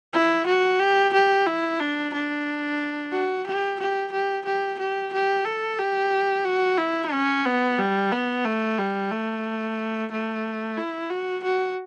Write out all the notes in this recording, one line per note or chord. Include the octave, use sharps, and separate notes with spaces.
E4
F#4
G4
G4
E4
D4
D4
F#4
G4
G4
G4
G4
G4
G4
A4
G4
F#4
E4
C#4
B3
G3
B3
A3
G3
A3
A3
E4
F#4
F#4